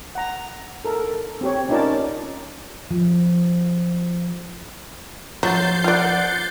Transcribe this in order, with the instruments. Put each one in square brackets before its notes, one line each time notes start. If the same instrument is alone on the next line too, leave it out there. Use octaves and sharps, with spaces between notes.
[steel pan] F#5 A#5
A4 A#4
C4 G4 C#5
C#4 D#4 F4 A#4 D5 A5
[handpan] F3
[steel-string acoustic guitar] F3 [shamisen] F#3 [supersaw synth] G6 A6 C7
[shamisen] F4 D5 [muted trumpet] F#5